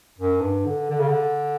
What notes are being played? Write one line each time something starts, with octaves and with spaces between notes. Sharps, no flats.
F#2
G2
D3
D3
C#3
D3